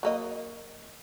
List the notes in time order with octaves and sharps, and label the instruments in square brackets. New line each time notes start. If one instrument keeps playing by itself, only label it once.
[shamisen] F#3 A#3 D#5